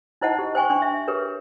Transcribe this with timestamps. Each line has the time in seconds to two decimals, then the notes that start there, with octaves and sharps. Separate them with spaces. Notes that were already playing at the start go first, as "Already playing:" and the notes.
0.21 D#4 E4 C5 D#5 F#5 A5
0.39 G4
0.55 C5 G5 G#5 C6 C#6
0.70 D4 G5 C6 C#6
0.82 E5
1.08 G4 G#4 A#4 B4 C#5